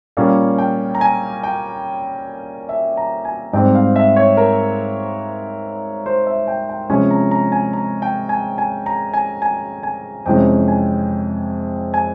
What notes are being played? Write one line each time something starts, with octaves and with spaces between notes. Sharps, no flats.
A#2 G3 A#3 C#4 F5
G5
A#5
G#5
G5
E5
A#5
G#5
G#2 G3 C4 G5
F5
E5
C#5
A#4
C5
E5
G5
G5
C3 F3 G#3 C#4 G#5
A#5
A#5
G#5
A#5
G5
G#5
G#5
A#5
G#5
G#5
G#5
F2 C3 E3 G#3 C#4 G5
G#5
G#5